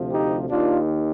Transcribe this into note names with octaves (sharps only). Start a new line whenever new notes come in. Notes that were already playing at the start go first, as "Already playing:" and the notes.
Already playing: D2 C3 F3
D#4 G4
D#2 D#3 D4 F4